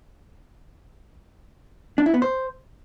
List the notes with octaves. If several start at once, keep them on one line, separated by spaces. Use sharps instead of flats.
D4
E4
B3
C5